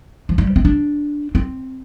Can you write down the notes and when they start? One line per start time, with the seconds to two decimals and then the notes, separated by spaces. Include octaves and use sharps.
0.29 F3
0.38 G3
0.56 C4
0.65 D4
1.35 C4